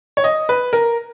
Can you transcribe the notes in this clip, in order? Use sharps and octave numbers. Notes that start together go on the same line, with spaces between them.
C#5
D#5
B4
A#4